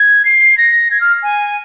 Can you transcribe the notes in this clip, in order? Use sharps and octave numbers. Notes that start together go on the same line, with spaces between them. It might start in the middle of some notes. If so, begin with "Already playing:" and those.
Already playing: G#6
C7
A#6
G#6
F6
G#5